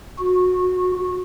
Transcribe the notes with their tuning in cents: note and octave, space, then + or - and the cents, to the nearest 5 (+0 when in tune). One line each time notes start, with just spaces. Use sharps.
F#4 -20